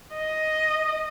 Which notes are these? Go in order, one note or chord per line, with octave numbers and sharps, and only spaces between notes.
D#5